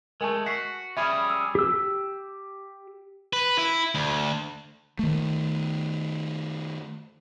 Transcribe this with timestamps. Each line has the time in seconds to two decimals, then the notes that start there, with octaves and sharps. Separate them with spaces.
0.21 G#3 A3 A#4 G#5 A5
0.46 F#4 B6 C7
0.97 G3 C#4 G#4 E5 B5 C#6
1.30 E6
1.55 G4 E6
3.33 B4
3.58 E4
3.95 D2
4.99 D#3 A3